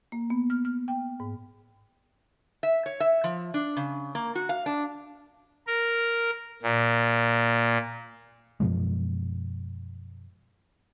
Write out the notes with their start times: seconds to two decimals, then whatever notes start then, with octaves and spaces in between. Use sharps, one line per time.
0.12 A#3
0.30 B3
0.50 F6
0.65 F6
0.88 G5
1.20 G#2
2.63 E5
2.86 C#5
3.00 E5
3.24 F3
3.54 D4
3.77 C#3
4.15 A#3
4.35 F#4
4.49 F5
4.66 D4
5.67 A#4
6.62 A#2
8.60 F#2 B2 F3 G#3